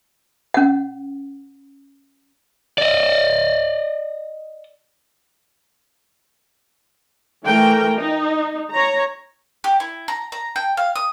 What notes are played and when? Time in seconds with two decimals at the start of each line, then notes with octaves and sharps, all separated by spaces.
0.54 C#4 F#5
2.78 D5 D#5
7.45 E3 A3 A#4 G5
7.97 D#4
8.72 C#5 A#5
9.64 G4
9.80 E4
10.08 A#5
10.32 A#5
10.56 G5
10.77 F5
10.96 D#6